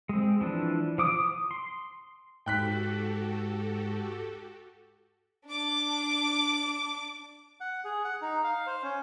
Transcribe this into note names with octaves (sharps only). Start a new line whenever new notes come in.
G#3 C4
E3 F3 D4
F3 D6 D#6
D#6
C6
G#2 F#4 G4 A4 G5 F#6 B6
D4 D6
F#5
G#4
F#5
D#4
F5
C5
C#4